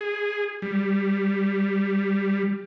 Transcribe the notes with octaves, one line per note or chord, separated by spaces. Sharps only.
G#4
G3